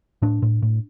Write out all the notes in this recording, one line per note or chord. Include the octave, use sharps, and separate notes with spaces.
A2 D4
A2
A2